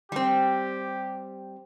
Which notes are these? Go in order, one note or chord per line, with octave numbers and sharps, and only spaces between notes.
G3 C4 G4